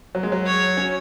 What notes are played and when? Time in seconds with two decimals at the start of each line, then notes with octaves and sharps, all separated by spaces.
0.15 F#3
0.23 G#3
0.32 F#3
0.46 C#5
0.77 C#4